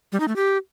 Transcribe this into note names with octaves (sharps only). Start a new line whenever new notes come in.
G3
D#4
A3
G4